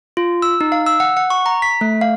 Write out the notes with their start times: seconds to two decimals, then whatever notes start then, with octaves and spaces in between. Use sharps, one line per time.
0.17 F4
0.42 E6
0.61 D#4
0.72 F5
0.86 E6
1.00 F#5
1.17 F#5
1.30 C#6
1.46 A#5
1.62 B6
1.81 A3
2.01 F5